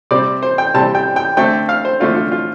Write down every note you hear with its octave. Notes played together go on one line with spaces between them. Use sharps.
C3 G3 C4 D5
C5
G5
C3 G3 C4 A5
G5
G5
D3 A3 C4 G5
F5
C5
D3 A3 C4 F4
F4
F4